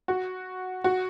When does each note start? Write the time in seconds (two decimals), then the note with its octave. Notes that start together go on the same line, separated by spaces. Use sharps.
0.08 F#4
0.84 F#4